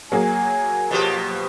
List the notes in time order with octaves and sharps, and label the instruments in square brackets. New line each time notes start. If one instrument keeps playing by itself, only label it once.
[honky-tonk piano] F#3 A#3 G#4 [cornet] G#5
[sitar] B2 F3 G4